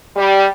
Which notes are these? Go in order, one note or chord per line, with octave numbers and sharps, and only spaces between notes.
G3